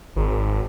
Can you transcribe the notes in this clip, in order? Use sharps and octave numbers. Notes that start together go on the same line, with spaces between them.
G#1